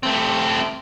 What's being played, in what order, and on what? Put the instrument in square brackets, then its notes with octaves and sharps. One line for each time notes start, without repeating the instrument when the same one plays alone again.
[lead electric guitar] A3 C4